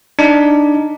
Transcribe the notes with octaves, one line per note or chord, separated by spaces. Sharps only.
D4 D#4